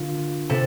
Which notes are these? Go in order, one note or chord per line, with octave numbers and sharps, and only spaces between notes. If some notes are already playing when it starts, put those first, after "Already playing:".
Already playing: D3 A#3 F4
C3 A4